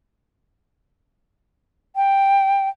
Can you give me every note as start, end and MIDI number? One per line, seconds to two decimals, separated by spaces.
1.96 2.69 79